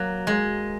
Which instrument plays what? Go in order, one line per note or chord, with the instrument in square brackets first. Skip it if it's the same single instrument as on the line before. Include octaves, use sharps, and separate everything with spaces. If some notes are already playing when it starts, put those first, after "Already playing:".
Already playing: [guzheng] F#3 A#3
G#3